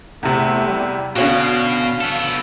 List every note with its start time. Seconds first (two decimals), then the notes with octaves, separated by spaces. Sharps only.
0.23 E2 C3 A3
0.67 G3
1.16 B2 D3 C#4 F#4 F5
2.01 B3 A4